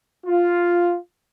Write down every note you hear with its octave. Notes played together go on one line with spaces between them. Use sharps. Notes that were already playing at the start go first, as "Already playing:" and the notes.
F4